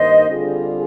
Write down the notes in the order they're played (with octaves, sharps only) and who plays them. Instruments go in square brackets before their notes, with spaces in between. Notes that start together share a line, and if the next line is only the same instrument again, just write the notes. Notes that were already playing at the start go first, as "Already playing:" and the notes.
Already playing: [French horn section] G2 D#3 A#3 D#4 [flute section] C5 D#5
[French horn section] D3 G3 C4 F4 G#4